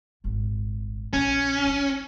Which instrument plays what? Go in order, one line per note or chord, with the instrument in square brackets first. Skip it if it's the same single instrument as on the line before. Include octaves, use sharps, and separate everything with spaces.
[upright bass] D#1 G#1
[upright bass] A#1 C#3 [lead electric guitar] C#4
[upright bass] F#1 D#4